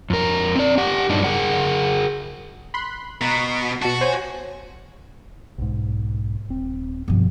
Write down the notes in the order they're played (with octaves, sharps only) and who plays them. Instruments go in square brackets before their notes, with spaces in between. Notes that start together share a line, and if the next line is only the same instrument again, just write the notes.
[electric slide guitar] F2 A#4
C4 D5
G4 F#5
G2 A#2 F#3 A#3 D4 D#4
G#4 A#4 F#5
[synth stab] B5 C6 F#6
[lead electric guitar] B2 [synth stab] A#5 C#6 F#6
[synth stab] B2 A5 [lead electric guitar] F#4
[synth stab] C5 C#5 G#5
[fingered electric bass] B1 G#2
D#1 C4
[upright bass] G2 F3 [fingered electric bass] B2 B3